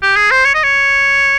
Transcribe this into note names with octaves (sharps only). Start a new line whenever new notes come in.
G4
G#4
C5
C#5
D#5
C#5